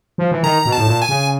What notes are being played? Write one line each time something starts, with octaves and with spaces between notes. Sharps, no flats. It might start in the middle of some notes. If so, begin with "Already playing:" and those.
F3
E3
D#3 A#5
B2
A5
A2
A#2
G#5
C#3